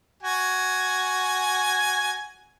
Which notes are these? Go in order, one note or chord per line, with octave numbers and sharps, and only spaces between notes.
F#4 G#5